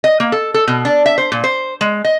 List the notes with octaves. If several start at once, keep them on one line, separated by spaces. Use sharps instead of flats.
D#5
A#3
A4
A4
B2
D4
E5
C5
A#2
C5
G#3
D#5